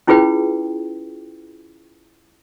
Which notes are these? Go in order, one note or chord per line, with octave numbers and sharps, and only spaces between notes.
C#4 E4 F4 G#4 B4 G5